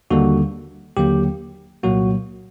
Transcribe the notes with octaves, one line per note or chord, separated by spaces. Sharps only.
D#2 D3 G3 A#3 F#4
D#2 D3 F#3 A#3 G4
C2 A#2 F#3 A#3 F#4